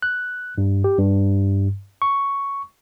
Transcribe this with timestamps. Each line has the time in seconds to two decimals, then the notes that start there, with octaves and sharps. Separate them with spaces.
0.02 F#6
0.58 G2
0.84 G4
0.98 G2
2.02 C#6